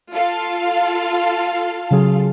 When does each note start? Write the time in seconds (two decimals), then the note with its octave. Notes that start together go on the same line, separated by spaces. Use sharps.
0.11 F4 A4 F5
1.91 C#3 F#3 G#4